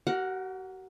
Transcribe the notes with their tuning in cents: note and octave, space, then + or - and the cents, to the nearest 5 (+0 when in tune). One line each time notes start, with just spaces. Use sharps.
F#4 +45 A#4 +0 F#5 -5